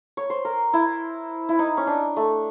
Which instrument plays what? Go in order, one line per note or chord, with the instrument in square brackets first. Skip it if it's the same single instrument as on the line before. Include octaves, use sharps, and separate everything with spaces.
[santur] C#5
C5
A#4
E4
E4
D#4
C#4
D4
A3